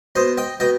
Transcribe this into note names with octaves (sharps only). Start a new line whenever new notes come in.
B2 C5 D#5
D#5 G5
B2 D#5 G5